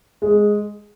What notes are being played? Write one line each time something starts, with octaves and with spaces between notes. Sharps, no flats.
G#3